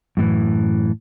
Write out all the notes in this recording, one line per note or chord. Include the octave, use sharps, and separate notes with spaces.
F#2 A2 E3